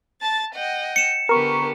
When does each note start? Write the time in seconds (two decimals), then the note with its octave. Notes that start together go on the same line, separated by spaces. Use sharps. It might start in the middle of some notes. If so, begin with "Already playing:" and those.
0.21 A5 A6
0.54 D#5 F#5 G5
0.96 C#7 E7
1.29 D3 B3 G4 A#4 C#6